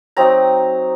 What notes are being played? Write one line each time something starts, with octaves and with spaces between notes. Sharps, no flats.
F#3 C4 D#4 A#5